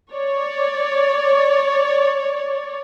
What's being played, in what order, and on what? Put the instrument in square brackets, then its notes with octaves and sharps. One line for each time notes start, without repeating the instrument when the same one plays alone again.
[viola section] C#5 D5